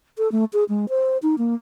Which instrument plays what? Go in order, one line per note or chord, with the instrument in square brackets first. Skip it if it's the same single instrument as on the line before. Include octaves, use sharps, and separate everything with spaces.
[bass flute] A4
A3
G#4
G#3
C5
D#4
A#3